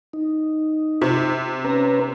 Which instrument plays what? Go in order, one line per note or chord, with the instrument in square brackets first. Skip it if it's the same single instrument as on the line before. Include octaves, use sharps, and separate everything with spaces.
[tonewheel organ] D#4
[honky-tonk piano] C3
[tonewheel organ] C#4 B4 A#5